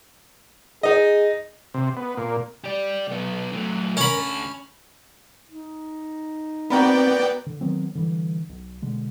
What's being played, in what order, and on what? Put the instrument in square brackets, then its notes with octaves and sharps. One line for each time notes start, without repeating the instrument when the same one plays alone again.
[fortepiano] D#4 D#5 [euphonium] G#4
[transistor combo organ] C3
B3
A#2
[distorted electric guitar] G4 D5
B1 B3
F#3 A3
[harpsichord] C#4 B5 [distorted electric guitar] A#4
[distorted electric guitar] D2 A5
[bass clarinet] D#4
[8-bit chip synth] B3 D5 G5 [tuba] C4 [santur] F#4 A#4 B4
[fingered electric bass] D3
D#3 F#3 B3 C4
D3 E3 G3
B1
B2 D3 G#3